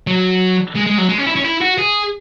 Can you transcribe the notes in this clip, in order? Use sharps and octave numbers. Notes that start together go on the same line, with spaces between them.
F#3
G#3
G#3
F#3
G#3
C#4
E4
C#4
E4
F#4
G#4